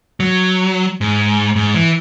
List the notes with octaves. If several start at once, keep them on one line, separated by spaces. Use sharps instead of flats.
F#3
G#2
G#2
E3